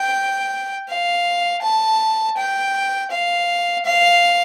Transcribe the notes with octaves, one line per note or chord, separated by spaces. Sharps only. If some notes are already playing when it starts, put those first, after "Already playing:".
Already playing: G5
F5
A5
G5
F5
F5